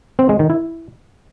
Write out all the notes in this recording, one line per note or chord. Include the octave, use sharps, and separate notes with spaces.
C4
G#3
D#3
E4